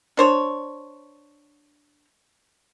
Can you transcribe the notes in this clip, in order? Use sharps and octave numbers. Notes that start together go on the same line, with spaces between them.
D4 C5 C#5